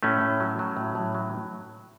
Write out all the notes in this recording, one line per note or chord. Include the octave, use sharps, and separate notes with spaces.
A2 A3 C#4
A2
F#3
F#3
A2
A2
F#3